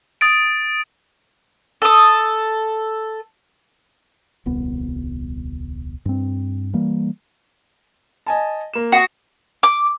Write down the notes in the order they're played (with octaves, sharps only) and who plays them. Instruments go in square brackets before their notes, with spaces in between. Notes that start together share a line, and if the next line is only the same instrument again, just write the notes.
[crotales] D#6 A6 D7
[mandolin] A4 D#6
[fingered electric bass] D#1 C2 B3
G2 C4
E3 G3 A#3
[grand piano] D#5 G#5 A5
A#3 E7
[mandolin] F#4 [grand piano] D#6 C7
[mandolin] D6